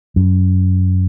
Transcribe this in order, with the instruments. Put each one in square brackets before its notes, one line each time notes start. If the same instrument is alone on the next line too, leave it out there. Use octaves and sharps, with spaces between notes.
[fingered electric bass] F#2